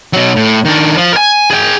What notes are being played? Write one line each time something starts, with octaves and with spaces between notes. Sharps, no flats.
B2 F#3
A2
D#3 D4
F3
A#4 G#5
G#4 G5